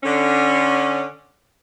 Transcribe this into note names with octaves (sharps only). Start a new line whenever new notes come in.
D3 C#4